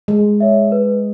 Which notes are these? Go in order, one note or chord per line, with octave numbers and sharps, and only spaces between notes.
G#3 G#4
C#5 E5
B4